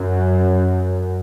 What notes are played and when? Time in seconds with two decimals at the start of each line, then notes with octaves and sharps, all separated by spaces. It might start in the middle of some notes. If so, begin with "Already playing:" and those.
Already playing: F#2